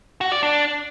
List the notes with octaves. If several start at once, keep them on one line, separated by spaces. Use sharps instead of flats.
F#4
D5
D4